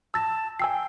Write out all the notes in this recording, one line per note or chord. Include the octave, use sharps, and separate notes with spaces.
A5 E6 A6 A#6
G5 G#5 E6 C7